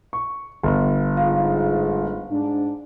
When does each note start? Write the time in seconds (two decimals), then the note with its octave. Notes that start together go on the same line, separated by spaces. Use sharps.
0.13 C#6
0.63 G1
1.17 G#2 F4 F5
2.30 G#2 D4